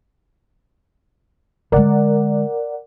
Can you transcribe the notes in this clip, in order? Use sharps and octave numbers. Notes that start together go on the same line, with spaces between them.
D3 G#3 A#4 D5 F#5